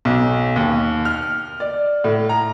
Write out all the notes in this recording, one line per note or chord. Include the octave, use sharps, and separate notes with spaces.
B1
D#2
F6
D5
A2
A#5